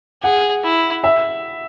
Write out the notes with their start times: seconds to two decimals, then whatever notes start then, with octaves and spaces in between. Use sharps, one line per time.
0.23 G#4 F#5
0.64 E4
1.04 E5